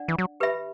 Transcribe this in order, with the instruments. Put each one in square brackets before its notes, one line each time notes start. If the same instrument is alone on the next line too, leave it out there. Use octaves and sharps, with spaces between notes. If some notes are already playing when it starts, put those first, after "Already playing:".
Already playing: [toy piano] D4 D5 F#5
[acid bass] E3
F#3
[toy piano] G4 B4 E5 B5